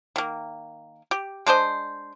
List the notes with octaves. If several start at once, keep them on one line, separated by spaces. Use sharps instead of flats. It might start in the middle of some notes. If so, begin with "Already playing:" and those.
D#3 A#3
G4
G#3 D4 C5 D#5